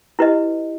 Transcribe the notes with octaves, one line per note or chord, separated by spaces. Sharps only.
E4 G4 B4 D#5